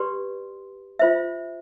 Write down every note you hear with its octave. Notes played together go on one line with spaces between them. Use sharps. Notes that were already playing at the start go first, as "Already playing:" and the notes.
Already playing: G4 B4 D5 C6
F4 C5 E5